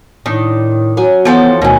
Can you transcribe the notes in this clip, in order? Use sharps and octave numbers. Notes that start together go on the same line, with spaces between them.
A2 D#3 D4
F#3 C#4 G#5
E3 F3 B3 F#4 A4 C#5 G5
D2 B2 D#3 B3 C#4